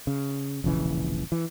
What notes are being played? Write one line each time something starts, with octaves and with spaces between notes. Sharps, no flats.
C#3
E1 A#1 C#3 E3
E3